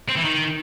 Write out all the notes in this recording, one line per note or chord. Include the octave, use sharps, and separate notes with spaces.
C4
E3
D#3